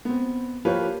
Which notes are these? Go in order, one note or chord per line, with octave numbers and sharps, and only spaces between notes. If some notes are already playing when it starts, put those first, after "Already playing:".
B3 C4
F3 A#3 F4 G4 B4 C#5